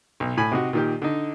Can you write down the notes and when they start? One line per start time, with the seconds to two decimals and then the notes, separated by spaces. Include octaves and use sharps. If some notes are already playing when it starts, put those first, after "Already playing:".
0.20 B1
0.37 A2 G#5 B5
0.52 C3 D#4 F#4
0.73 A#2 D#3 G4
1.02 D3 D#4